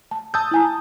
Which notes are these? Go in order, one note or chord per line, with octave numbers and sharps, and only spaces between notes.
A5
A5 D#6 E6 G6
E4 G#5 A#5